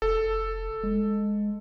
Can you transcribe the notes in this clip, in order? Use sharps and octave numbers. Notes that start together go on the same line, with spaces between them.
F1 A4
G#3